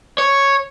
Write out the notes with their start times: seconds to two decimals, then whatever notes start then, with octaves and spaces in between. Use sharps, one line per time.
0.18 C#5